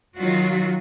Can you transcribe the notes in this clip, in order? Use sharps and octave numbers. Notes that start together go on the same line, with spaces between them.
D#3 F#3 F4 F#4